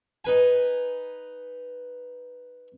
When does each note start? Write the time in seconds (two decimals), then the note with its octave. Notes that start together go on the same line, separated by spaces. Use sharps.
0.25 D#4 B4 G#5